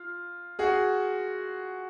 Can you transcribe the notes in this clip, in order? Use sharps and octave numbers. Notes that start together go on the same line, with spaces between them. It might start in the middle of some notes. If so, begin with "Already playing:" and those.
Already playing: F4
F#4 G#4